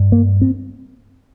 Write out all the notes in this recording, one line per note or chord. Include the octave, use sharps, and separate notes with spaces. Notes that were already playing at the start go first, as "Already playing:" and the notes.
Already playing: G2
A#3
C4